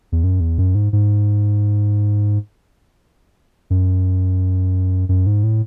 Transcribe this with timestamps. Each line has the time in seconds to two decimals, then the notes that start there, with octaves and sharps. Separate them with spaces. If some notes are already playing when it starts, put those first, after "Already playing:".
0.12 E2
0.24 F#2
0.40 E2
0.58 F#2
0.75 G#2
0.93 G#2
3.70 F#2
5.09 F#2
5.26 G#2
5.43 A2